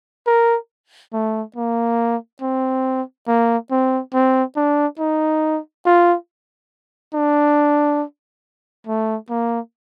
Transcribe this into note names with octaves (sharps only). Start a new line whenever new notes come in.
A#4
A3
A#3
C4
A#3
C4
C4
D4
D#4
F4
D4
A3
A#3